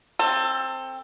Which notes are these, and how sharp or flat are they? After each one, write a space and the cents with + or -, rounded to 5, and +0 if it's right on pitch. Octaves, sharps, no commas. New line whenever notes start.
C4 +15 A4 +25